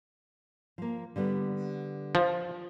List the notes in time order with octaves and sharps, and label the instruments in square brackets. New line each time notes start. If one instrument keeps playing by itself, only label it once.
[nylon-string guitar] F3 A#3
D3 G3 B3
[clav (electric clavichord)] F3